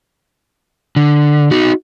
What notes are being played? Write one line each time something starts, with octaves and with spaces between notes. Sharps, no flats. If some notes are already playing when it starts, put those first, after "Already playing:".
D3
D#4 F#4